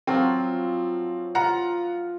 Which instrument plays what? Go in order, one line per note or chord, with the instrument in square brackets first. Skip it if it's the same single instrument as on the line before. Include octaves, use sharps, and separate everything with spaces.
[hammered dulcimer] F3 F#3 F4 [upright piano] C4
[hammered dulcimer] F4 [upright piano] F#5 A#5